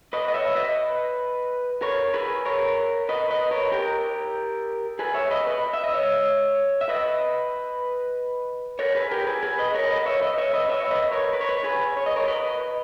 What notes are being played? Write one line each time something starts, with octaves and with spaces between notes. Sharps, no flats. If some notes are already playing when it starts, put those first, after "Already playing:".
B4 D#5
D#5
C#5 E5
B4 D#5
A#4 C#5
G#4 B4
A#4 C#5
B4 D#5
B4 D#5
A#4 C#5
G4 A#4
G#4 B4
C#5 E5
B4 D#5
B4 D#5
E5
D#5
C#5 E5
E5
B4 D#5
A#4 C#5
G#4 B4
G4 A#4
G#4 B4
G#4 B4
B4 D#5
A#4 C#5
B4 D#5
C#5 E5
B4 D#5
C#5 E5
B4 D#5
C#5 E5
C#5
B4 D#5
A#4 C#5
B4
C#5
B4
C#5
G#4 B4
C#5
D#5
A#4 C#5
B4 D#5